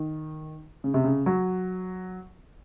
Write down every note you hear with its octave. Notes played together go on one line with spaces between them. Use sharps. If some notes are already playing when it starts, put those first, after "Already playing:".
Already playing: D#3
C#3
C3
C#3
F#3